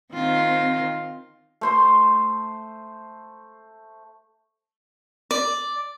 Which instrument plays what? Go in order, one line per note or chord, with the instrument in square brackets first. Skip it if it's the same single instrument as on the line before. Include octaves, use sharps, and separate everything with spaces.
[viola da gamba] D#3 F4 [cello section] C4
[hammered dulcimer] A3 C5 C6
[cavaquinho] D5